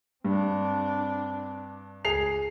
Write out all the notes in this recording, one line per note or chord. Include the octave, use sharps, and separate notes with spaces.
G2 C4 D4
C#2 G#4 C7 F7